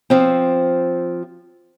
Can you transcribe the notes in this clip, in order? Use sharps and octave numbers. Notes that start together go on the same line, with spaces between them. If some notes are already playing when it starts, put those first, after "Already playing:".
F3 C4